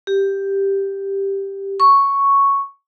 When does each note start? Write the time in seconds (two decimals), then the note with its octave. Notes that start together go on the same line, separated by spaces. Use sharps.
0.07 G4
1.80 C#6